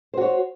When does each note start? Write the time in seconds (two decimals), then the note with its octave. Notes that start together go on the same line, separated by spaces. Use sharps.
0.14 C5
0.17 F#4
0.21 C#5